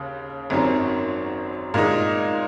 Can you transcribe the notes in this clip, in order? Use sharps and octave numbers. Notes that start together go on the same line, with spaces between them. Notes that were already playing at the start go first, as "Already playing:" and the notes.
Already playing: D#2 C#3
G#1 F#2 D#3 F#3
A#2 G#3 D#4